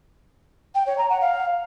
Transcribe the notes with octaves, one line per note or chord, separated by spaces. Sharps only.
G5
C#5
A#5
F#5
F5